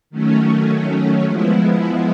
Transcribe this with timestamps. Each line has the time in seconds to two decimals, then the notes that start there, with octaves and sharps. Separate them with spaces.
0.10 D#3 F#3 A3 C#4
1.25 F3 G#3 B3 E4